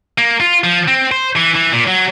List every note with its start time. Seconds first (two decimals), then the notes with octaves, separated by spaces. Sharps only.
0.18 A#3
0.40 F4
0.64 F3
0.88 C4
1.12 C5
1.36 E3
1.55 E3
1.72 A#2
1.87 F#3